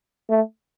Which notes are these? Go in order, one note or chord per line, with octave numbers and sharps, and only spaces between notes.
A3